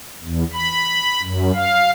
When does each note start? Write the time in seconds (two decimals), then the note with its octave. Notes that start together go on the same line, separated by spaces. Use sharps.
0.23 E2
0.53 B5
1.22 F#2
1.55 F5